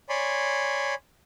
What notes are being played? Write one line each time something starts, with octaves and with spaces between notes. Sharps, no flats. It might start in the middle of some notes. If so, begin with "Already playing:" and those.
C#5 D5 G#5 B5 C6